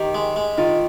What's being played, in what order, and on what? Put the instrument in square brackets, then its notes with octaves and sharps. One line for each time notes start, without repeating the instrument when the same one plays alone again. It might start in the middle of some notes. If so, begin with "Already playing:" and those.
Already playing: [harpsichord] D#3 [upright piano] G4
[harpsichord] G#3
G#3
[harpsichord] D#3 [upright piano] F4